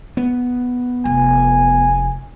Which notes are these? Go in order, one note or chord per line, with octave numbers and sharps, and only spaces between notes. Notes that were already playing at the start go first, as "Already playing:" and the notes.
B3
F1 G#5